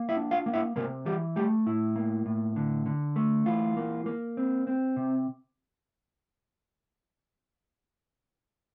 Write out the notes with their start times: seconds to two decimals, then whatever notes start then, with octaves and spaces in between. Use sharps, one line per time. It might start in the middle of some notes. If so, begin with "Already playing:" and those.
Already playing: A#3
0.09 E4 E5
0.17 D4
0.31 F4 F5
0.46 A#3
0.53 E4 E5
0.76 C3 A#3 A#4
1.06 E3 G3 G4
1.36 G3 A3 G4
1.66 A2 E4
1.96 A#3
2.26 A2
2.56 D3
2.86 D3
3.16 A3
3.46 E3 F4
3.77 A#3
4.06 A#3
4.37 C4
4.67 C4
4.97 C3